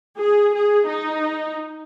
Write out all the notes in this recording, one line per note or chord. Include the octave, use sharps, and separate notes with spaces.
G#4
G#4
D#4